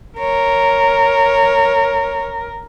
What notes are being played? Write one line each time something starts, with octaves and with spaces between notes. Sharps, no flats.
A#4 C#5